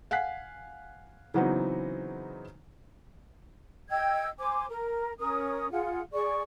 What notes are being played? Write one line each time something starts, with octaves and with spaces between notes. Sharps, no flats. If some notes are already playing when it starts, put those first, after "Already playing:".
F5 F#5 G#5 F#6 B6 C7
C#3 E3 F#3 B3 C4 D#4
D#5 G5 E6 G#6
C5 G#5 D6
A#4
C#4 A#4 D#6
F4 G#4 F#5
G#4 D5 C#6